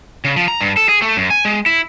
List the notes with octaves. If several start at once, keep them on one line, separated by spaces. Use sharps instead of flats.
C#3
F3
A#5
G2
A4
G#4
A3
F#2
G#5
G#3
E4